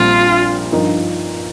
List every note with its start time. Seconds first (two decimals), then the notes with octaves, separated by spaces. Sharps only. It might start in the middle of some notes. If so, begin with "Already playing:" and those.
Already playing: A#1 A#2 G3 C4 F4
0.72 G2 F3 D#4 A#4